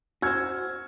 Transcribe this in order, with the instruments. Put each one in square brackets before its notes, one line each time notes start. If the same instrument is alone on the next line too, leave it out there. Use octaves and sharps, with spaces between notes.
[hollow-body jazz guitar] F#4 C5 [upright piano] E6 F6 G#6